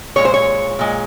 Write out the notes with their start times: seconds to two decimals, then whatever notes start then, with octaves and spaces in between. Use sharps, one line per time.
0.16 A#2 G#3 C#5
0.25 C5
0.34 C#5
0.79 A#2 G#3